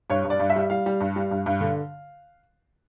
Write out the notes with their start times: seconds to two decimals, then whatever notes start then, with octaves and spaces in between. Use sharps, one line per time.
0.10 G2 C#5
0.25 G2
0.30 D5
0.40 G2
0.50 E5
0.56 G3
0.70 G3 F5
0.86 G3
1.00 G2
1.16 G3
1.31 G2
1.46 G2
1.61 D3